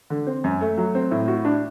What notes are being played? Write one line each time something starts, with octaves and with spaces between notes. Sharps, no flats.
D3
C4
F#2
A3
F#3
C4
A2
F#4
D4